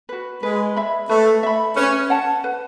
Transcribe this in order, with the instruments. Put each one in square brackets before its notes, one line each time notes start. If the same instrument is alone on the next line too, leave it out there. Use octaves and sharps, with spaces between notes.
[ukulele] F#4 B4
[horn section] G#3 [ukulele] B4
[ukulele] E5 B5
[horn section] A3 [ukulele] B4
[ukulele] E5 B5
[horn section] C#4 [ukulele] B4
[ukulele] F#5 A5
B4